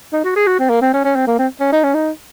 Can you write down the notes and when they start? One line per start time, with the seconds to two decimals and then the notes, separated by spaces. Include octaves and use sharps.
0.13 D#4
0.24 F#4
0.36 G#4
0.47 F#4
0.59 C4
0.70 A#3
0.82 C4
0.94 C#4
1.04 C#4
1.16 C4
1.27 A#3
1.39 C4
1.60 C#4
1.73 D#4
1.84 C#4
1.95 D#4